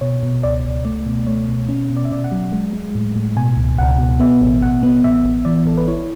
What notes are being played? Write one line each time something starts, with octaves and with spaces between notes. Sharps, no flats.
B2 C#5
B2
C#2 D5
C#2
A3 D5
B2
A3 C#5
B2
C#4
B2
D5
E5
B2 D5
F#5
F#3
G#3
G#3
A2
A2
B2 G#5
C#2
C#2 F#5
B2
B3 E5
A1
A1 F#5
B3
A1 E5
A1
E3 D5
A1 A4
B4
E4 C#5